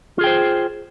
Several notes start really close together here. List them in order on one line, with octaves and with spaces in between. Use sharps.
F4 G#4 G5 C5